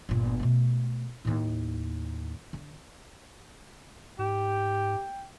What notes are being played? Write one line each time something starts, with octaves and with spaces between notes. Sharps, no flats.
G1 A#2
B2 A3
D#2 A2
D3
G#2 G4 G5